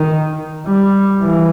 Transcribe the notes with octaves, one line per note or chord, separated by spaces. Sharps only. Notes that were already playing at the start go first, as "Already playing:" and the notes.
Already playing: D#3
G3
E3